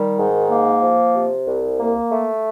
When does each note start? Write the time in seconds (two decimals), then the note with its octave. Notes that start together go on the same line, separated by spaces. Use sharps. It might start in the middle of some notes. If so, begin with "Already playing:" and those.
Already playing: D#3 G3
0.19 G#2
0.50 A#3
0.83 F3
1.15 C3
1.47 C2
1.79 A#3
2.12 A3